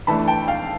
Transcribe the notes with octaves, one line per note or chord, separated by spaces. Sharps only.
E3 A3 D4 A5 B5
G5 A5
F5 G5